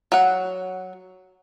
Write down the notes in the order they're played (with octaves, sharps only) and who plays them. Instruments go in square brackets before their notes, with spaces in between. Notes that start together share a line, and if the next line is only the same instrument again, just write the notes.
[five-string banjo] F#3 F#5